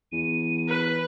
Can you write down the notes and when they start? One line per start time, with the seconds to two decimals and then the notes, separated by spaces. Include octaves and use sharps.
0.12 E2 D#7
0.69 B4